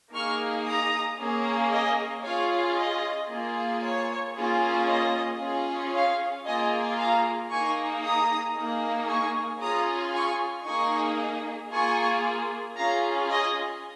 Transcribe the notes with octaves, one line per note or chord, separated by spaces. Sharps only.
A#3 D#4 G#4 C#6 F6
A#5 D#6
A#3 C#4 G#4
D#5 G#5
C#4 F4 G#4 C#5 F5
D#5
A#3 F4 G#4
C#5
A#3 C#4 F4 G#4
D#5
C#4 F4 G#4
C#5 F5
A#3 F4 G#4 D#5 G#5
F5 A#5
A#3 D#4 G#4 G#5 C#6
A#5 D#6
A#3 D#4 G#4
G#5 C#6
C#4 F4 G#4 A#5 D#6
G#5 C#6
A#3 D#4 G#4 G#5 C#6
A#3 F4 G#4 G#5 C#6
C#4 F4 G#4 F5 A#5
D#5 G#5